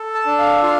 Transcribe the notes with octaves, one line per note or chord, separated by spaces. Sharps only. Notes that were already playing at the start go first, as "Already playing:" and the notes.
Already playing: A4
A5
D4
F5
F4 F5